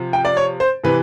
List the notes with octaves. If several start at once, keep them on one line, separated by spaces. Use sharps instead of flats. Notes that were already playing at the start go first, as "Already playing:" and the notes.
Already playing: C3 F3
G5
D5
C#5
C5
C3 E3 B4